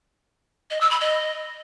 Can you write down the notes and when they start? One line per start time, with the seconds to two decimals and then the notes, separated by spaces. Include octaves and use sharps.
0.71 D#5
0.81 E6
0.91 B5
1.01 D#5